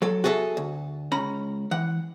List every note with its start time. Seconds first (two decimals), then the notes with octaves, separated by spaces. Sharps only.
0.02 F#3 A4
0.24 F#4 G#4 A4 D5 E5
0.57 D2
1.12 C#2 C#4 A#5 B5
1.71 E3 F#5